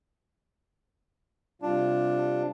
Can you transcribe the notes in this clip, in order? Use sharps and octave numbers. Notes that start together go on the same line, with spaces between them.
C3 G3 D4 F4